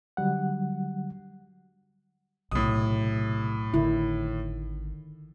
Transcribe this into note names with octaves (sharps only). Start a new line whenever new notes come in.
D3 F#3 G3 F#5
B1 A2 C3 D#6
G#1 D3 D#3 E4